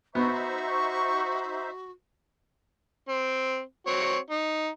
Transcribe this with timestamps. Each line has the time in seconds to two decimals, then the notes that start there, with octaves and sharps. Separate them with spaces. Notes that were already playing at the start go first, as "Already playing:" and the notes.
0.15 B3 D#4 F#4 C5 E5 C#6
3.09 C4
3.87 C4 F#4 C#5
4.30 D#4